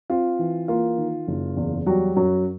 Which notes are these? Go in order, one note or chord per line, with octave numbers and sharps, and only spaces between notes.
C4 F4
E3
A#3 F4
D#3
F#1
E2
F#3 G3 F#4
F#2 F#3 F#4